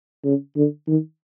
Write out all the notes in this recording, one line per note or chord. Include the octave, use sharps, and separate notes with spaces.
C#3
D3
D#3